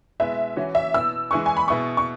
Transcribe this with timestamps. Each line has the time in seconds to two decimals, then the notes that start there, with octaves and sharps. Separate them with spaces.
0.20 B2 G#3 E4 B4 E5
0.56 E3 C#4 F#4 C#5
0.75 E5
0.94 B2 B3 E4 E6
1.31 E3 G#3 E4 G#4 B4 C#6
1.46 G#5
1.57 B5
1.68 B2 B3 E4 G#4 C#6
1.97 C#6